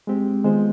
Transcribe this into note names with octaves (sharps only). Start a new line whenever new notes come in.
G#3 C4 G4
D#3 G#3 B3 F4 C5